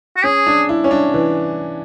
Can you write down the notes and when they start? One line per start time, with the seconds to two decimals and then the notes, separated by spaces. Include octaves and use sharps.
0.17 F#4
0.24 C#4 G#4
0.47 D4
0.69 E4
0.84 C#4
0.91 D4
1.14 E3